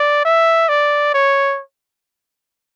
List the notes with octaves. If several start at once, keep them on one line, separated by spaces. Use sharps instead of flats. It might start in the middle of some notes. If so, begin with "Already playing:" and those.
Already playing: D5
E5
D5
C#5